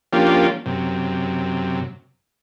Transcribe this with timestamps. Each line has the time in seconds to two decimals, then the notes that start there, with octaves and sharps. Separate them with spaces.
0.13 F3 A#3 C#4 D4 F4 G4
0.66 F#2 C3